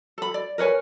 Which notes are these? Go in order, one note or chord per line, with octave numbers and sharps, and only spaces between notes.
A4 B5
D5
A#4 B4 C#5 G#5